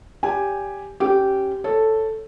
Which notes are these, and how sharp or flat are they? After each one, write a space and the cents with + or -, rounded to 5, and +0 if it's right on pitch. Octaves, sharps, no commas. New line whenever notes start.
G4 +5 D5 -40 G#5 +0
C#4 -15 G4 -15
A4 +0 C#5 +0